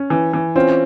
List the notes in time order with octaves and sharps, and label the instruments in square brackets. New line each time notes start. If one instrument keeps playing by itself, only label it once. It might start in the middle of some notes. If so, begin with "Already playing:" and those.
Already playing: [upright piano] C#4
E3
E3
[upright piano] C4 [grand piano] C#4 F4